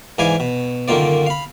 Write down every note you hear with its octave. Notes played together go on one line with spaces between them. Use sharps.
G#2 E3 D5 F5 G#5
B2
F#2 D3 D#3 A#3 F4 D5
F5 B5